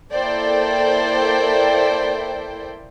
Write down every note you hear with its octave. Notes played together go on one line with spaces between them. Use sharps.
A#3 E4 A4 C5 D5 G5